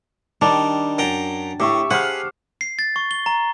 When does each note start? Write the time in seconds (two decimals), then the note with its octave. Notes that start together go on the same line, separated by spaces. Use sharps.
0.42 D#3 G3 D4 G5
0.98 F#2 G5 A5 A#5
1.60 A2 G4 E5 C#6
1.91 G#4 C5 F5 F#5 B5
2.61 C7
2.79 A6
2.96 C#6
3.11 G7
3.26 A#5